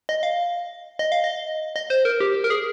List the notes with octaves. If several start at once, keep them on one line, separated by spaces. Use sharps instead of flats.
D#5
F5
D#5
F5
D#5
D#5
C5
A#4
G4
A#4
G#4